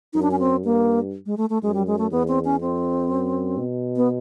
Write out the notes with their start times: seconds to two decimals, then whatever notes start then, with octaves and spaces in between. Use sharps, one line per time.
0.13 F#2 D#4
0.22 D4
0.31 C#4
0.39 C4
0.64 G2 A#3
1.26 G#3
1.38 A3
1.50 A3
1.63 F#2 G#3
1.74 G3
1.87 G#3
1.99 A3
2.11 E2 B3
2.28 C4
2.45 C#4
2.61 F2 C4
3.10 F#2
3.58 B2
3.96 B3